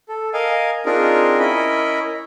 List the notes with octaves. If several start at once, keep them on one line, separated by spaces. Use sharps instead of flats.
A4
A#4 D#5 F5 G#5
C4 D4 D#4 F4 G#4 A#4
C#4 E4 A#4 D#5 B5